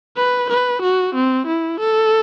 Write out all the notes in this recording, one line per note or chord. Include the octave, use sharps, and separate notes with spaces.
B4
B4
F#4
C4
E4
A4